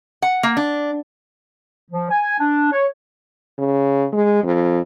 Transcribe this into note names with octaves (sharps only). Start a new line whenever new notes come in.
F#5
A#3
D4
F3
G#5
D4
C#5
C#3
G#3
F2